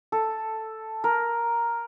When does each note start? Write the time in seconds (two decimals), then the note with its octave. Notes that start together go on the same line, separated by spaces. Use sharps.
0.12 A4
1.04 A#4